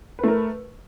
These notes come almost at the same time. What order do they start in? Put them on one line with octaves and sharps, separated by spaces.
B4 A3 A#4